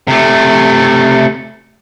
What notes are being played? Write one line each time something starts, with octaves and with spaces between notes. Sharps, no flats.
C3 A3